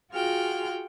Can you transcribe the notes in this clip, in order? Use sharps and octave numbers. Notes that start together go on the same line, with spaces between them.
F4 F#4 G#4 G5 F6